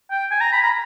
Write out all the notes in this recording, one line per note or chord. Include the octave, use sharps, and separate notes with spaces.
G5
G#5
A#5
B5
A#5